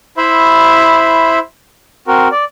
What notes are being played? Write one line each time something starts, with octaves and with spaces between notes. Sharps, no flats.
E4 C5 E5 B5
C4 F#4 A#4
D5